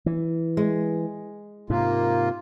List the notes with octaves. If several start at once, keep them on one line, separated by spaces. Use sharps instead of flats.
E3
G#3
G#2 C3 A#3 F4